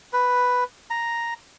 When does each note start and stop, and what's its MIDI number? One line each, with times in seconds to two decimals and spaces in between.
0.13 0.64 71
0.90 1.34 82